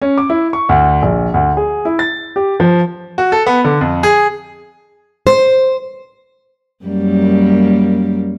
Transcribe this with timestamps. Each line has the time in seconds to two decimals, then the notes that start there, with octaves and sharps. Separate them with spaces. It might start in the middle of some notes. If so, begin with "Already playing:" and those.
0.02 C#4
0.18 D6
0.30 E4
0.53 C#6
0.69 D2
1.02 A#1
1.34 D2
1.57 G#4
1.85 E4
1.99 A6
2.36 G4
2.60 F3
3.18 F#4
3.32 A4
3.46 B3
3.65 D3
3.81 F2
4.03 G#4
5.27 C5
6.85 F#2 G3 A#3